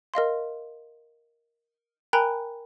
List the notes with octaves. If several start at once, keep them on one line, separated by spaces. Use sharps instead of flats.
A#4 D#5 F5 C6
A#4 G5 G#5 A#5 B5 F#6